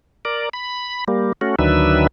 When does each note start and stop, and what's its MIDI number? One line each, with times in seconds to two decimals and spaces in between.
0.25 0.49 70
0.25 0.49 74
0.53 1.04 83
1.08 1.33 55
1.08 1.33 58
1.41 1.55 57
1.41 1.55 61
1.41 1.55 66
1.59 2.07 38
1.59 2.07 51
1.59 2.07 54
1.59 2.07 62
1.59 2.07 71
1.59 2.07 76